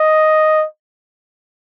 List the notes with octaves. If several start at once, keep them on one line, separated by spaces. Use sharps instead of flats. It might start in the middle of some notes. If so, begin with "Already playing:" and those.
Already playing: D#5